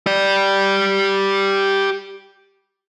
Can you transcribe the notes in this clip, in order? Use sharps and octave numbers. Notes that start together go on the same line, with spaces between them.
G4 D5